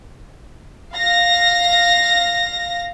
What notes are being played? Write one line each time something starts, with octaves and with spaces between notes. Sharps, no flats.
F5 A#6